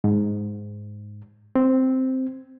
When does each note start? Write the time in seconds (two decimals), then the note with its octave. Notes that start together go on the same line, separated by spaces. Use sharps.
0.04 G#2
1.55 C4